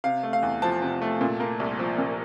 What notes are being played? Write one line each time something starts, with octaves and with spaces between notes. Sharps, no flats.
C3 F5
A3
F5
E2
F3 A5
C3
A3
A#2
A#3
C2
F3
A#2